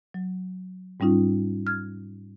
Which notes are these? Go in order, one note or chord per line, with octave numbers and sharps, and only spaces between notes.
F#3
G#2 G3 C#4 D#4 F4
F6 G#6